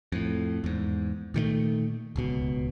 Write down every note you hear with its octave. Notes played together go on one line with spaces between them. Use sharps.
F2 A2
E2 G#2
A#2 D#3 F#3 A3
D1 C#2 B2